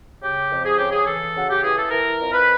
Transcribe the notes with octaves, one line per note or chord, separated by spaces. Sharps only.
C#3 G4
F2
G#4
C#3 G4
G#4
E3 A4
C#3 F#4
G4
E3 G#4
A4
E3 A#4
F2
B4